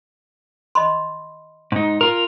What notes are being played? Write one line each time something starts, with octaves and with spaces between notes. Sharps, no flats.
D#5 B5 C6
G#2 D#4
F4 A#4